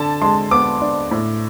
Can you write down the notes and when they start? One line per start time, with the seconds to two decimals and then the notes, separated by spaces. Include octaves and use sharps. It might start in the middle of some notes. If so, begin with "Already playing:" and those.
Already playing: D3 A5
0.21 G#3 C6
0.51 B3 D6
0.81 D4
1.11 A2